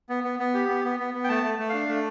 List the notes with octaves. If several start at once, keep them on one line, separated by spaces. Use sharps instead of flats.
B3
B3
B3
G4
B3
B3
B3
B3
G5
A3 A5
A3
A3
D4 F5
A3